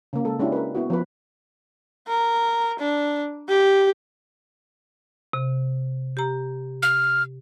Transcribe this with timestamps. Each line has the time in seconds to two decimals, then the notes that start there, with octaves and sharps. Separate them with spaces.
0.13 C#3 A#3
0.25 G#3 A4
0.39 G#3 C#4 D4 E4 F#4 G4
0.52 A#4 B4
0.75 B3 E4 F#4
0.90 F3 B3 B4
2.08 A#4
2.80 D4
3.48 G4
5.33 C3
6.17 G4 A#5
6.82 F6